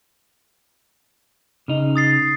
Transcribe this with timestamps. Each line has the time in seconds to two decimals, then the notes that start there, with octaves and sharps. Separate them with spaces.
1.68 C#3 D#4
1.96 D#6 A6 C7